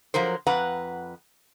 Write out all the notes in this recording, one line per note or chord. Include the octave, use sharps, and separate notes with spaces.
F3 F#3 A#4 C5
F2 B4 F#5 A#5